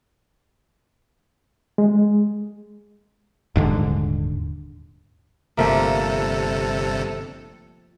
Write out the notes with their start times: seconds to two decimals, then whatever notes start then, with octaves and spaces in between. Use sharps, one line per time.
1.78 G#3
3.56 D#1 G#2 D3
5.57 G1 C3 F3 A3 A#3 A4